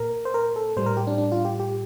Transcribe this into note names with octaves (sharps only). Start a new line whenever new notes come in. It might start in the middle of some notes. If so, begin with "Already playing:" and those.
Already playing: A#2 A#4
C5
A#4
A4
A2 G3 C5
A#4
G4
D4
D4
F4
G4
G4